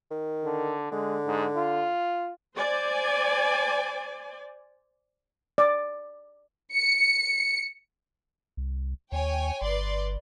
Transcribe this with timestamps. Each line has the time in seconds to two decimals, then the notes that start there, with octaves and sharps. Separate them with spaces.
0.10 D#3
0.45 D3
0.91 D3 G#3
1.26 G#2
1.57 F4
2.55 C5 D5 G#5
5.58 D5
6.73 C#7
8.57 C2
9.12 D#2 C#5 G5 G#5
9.62 G1 B4 D5 C6